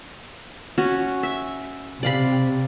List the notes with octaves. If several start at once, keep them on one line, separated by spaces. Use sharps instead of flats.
C#4 F#4
E5
C3 D5 F5 B5